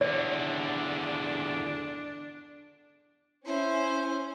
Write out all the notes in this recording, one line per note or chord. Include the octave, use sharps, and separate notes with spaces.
E2 D3 D4 D5
C#4 E4 C5